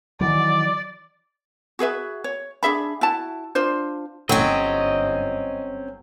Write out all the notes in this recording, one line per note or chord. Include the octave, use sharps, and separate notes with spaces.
D#3 E3 F#3 D5
F#4 G#4 B4 E5
C#5
D4 G#4 E5 B5
E4 F#4 A5
D4 F4 C5
G1 F#3 C4 C#4 D#5